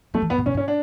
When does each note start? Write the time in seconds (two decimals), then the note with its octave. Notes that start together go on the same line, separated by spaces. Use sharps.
0.14 F#3 A3
0.22 E3
0.30 F#2 B3
0.38 G#2
0.46 A2 C#4
0.54 G#2
0.57 C#4
0.68 D4